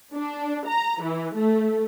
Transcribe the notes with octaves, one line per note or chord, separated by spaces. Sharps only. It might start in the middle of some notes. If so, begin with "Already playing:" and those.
D4
A#5
E3
A3